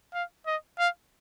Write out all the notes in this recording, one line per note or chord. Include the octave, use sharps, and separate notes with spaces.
F5
D#5
F5